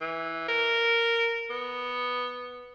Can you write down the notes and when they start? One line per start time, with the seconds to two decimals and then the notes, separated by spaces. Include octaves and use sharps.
0.01 E3
0.48 A#4
1.50 B3